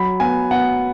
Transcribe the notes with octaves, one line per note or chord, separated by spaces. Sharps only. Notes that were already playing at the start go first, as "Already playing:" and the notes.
Already playing: F#3 B5
B3 G#5
B3 F#5